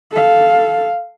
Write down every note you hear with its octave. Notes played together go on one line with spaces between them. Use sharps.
A4 F5